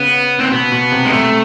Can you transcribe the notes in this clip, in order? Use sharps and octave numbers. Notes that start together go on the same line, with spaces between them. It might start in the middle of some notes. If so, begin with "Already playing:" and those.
Already playing: C#3 B3
C4
B2 B3
B2
C3
G#3
C3 A3